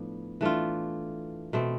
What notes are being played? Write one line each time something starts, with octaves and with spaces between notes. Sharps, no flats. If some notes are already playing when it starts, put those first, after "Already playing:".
Already playing: A2 F3 B3 D4
E3 A3 D4 F4
B2 A3 C4